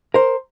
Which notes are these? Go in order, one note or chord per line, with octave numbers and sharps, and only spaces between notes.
A#4 C5